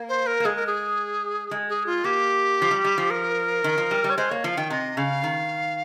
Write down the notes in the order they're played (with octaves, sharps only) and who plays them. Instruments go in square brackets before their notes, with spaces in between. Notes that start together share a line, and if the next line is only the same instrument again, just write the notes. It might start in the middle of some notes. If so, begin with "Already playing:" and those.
Already playing: [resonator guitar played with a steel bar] A#3
[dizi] C5
A#4
[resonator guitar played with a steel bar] A#3
[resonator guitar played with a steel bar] G#3 [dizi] G#4
[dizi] A#4
G#4
[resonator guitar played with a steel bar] G#3
[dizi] G#4
F4
[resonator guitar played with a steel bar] A#3 [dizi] G4
[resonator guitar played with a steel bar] F3
G3
G3
F3
[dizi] A#4
[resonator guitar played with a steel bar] D#3
F3
G3
G3
[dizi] C#5
[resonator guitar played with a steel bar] G#3 [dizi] C5
[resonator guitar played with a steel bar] A#3 [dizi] C#5
[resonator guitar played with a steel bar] F3 [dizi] F5
[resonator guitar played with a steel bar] D#3 [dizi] G5
[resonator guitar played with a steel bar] C3 [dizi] D#5
[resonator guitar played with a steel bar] C#3 [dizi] F5
[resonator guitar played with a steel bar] D#3